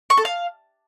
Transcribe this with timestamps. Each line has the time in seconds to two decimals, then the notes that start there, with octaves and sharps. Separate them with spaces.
0.10 C#6
0.18 A4
0.25 F5